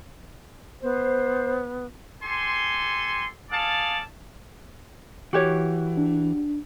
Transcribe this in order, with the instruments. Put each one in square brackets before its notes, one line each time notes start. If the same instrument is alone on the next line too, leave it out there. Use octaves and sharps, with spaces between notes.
[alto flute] B3 [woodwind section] C5
[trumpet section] G4 A4 G#5 C6
G#4 A4 D5 F5 A5
[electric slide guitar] E3 [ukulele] F#4 G4 C#5
[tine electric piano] D4